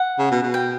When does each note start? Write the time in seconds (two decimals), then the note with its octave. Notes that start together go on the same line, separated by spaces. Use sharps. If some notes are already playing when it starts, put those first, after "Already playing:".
Already playing: F#5
0.19 C#3
0.31 B2
0.43 B2
0.54 G5